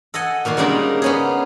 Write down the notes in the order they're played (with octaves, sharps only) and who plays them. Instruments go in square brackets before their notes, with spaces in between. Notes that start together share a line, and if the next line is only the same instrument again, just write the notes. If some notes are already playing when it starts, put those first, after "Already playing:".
[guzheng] A4 D#5 F#5 G#5
A#2 D#3 F#4 C6
C#3 G3 G#3 A#3 D4 D#4
B3 C#4 G#4